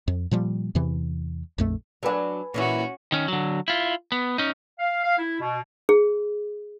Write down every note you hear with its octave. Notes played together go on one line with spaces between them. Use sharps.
F2
A#2 F3 G3
E2 C3 E3
A#1 F2 A3
F#3 D4 A4 B4 G#5
A#2 E3 C#4 E4 F#4
D#3 C#4
D3 F#3
E4 F4
B3
C#4 D#4
F5
F5
E4
B2
G#4